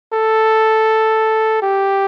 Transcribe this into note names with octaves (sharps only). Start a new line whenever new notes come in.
A4
G4